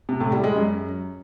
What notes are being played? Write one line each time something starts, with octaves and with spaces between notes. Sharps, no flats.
C3
A2
G3
G#3
F#2